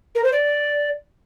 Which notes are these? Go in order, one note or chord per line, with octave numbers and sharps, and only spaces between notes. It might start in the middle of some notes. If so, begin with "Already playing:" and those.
A#4
C5
D5